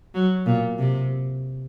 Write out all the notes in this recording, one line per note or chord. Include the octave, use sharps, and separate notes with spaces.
F#3
A#2
C3